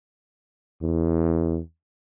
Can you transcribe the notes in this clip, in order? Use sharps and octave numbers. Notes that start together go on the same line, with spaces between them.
E2